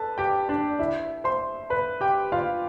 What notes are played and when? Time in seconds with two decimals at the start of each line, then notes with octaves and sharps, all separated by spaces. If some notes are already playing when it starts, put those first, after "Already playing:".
Already playing: A4 B4 A5
0.18 G4 G5
0.49 D4 D5
0.79 E4 E5
1.24 C5 C6
1.70 B4 B5
2.01 G4 G5
2.32 F4 F5